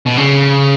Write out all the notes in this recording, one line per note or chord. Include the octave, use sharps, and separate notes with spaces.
B2
C#3